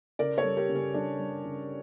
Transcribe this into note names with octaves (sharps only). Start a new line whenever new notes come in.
C#3 A#4 D5
A4 C#5
G3
G4 A#4
C#3
C#4
G3 D4
G3
C#3